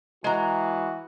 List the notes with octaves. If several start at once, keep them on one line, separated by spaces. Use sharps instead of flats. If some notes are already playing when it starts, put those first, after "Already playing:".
E3 G#3 F#4 A#5